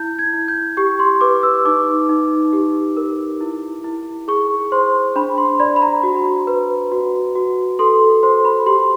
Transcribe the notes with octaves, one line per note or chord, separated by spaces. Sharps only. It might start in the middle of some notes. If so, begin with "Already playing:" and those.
Already playing: E4 G6
G#6
E4
G6
G4 C#6
C6
B4 D6
E6
D#4 D6
D#4
G4
A#4
E4
E4
G#4 C#6
C5 C6
D4 B5
C6
D5 B5
B5
A#5
F#4
B4
F#4
F#4
A4 C6
C5 C6
B5
G4 C6